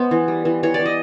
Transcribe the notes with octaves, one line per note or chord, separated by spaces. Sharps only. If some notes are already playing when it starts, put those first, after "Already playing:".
Already playing: G#3 B3 C5
E3
G3
E3
E3 C#5
E3 D5
D#5